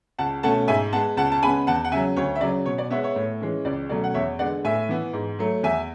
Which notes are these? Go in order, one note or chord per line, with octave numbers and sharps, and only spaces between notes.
C#2 F#5 A5
B2 A3 C#4 F#5 A5
G#2 E5 G#5
G#3 B3 F#5 A5
C#2 F#5 A5
A5
C#3 G#3 B3 G#5 B5
E2 F#5 A5
F#5
C#3 F#3 E5 G#5
D2 C#5
E5
C#3 F#3 D5
B2 C#5
D5
G#3 B3 C#5 E5
C#5 E5
A2
E3 G#3 C#4
C#2 D5
B2 F#3 A3 C#4 D5
F#5
E2 C#5 E5
D3 G#3 B3 D5 F#5
A2 E5 G#5
E3 B3
G#2
F#3 A3
E2 E5 G#5